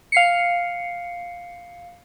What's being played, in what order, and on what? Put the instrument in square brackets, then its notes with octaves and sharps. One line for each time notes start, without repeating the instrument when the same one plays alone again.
[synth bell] F5 C7 C#7